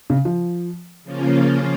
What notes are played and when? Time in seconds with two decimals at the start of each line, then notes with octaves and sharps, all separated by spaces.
0.10 C#3
0.25 F3
1.03 C#3 F3 A#3 C#4 F4